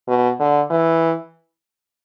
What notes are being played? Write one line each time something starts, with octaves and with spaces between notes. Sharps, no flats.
B2
D3
E3